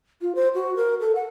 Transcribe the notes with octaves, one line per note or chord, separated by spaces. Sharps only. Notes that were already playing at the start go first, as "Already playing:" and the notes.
F4
C5
F#4
A#4
A4
F#5